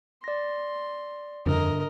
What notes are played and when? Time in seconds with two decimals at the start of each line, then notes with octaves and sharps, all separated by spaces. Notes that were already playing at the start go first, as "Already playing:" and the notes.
0.24 D5 C6 A#6
1.46 G1 F2 A#4 D#5